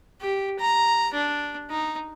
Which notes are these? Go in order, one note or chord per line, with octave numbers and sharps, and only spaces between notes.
G4
A#5
D4
D#4